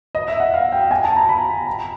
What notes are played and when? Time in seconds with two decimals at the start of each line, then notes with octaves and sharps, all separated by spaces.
0.15 D#5
0.28 E5
0.40 F#5
0.54 F5
0.72 G5
0.91 G#5
1.04 A5
1.16 A#5
1.29 B5
1.67 A#5